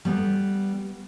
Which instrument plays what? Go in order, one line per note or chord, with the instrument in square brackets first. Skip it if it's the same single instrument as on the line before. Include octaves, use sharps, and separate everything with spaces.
[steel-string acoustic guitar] G3 B3